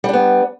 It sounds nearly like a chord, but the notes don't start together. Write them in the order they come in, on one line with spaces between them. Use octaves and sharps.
G3 D4 B3